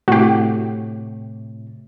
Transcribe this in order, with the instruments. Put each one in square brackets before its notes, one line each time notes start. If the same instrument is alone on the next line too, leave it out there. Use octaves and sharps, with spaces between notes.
[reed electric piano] A2 C3 [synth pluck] F#4 G4